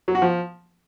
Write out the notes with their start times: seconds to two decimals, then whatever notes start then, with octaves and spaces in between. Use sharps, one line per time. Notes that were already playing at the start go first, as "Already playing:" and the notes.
0.08 F#3
0.15 F#4
0.22 F3